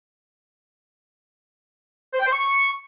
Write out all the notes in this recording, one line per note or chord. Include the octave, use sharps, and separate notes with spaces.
C5
G5
C5
C#6